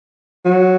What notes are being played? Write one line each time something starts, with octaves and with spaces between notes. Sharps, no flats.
F#3